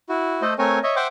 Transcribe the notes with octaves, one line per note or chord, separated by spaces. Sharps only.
E4 F#4
A3 A4 C5 D#5
A3 C4 A#4 C#5 G#5
C#5 D#5 E5
C5 E5 F#5 G5 C6 D6